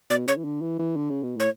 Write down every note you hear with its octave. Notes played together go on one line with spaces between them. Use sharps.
B2 D5
C#3 C#5
E3
D3
E3
E3
D3
C#3
B2
A2 C#5